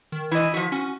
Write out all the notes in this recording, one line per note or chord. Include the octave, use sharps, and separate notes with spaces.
D#3
E3 E4 D#5
F3 F#4 B6
C#4 F#4